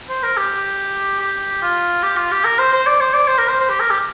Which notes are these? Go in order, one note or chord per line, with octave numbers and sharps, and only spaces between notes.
C5
A#4
G4
G4
F4
G4
F4
G4
A#4
C5
C5
D5
C5
D5
C5
A#4
C5
C5
G4
A#4
G4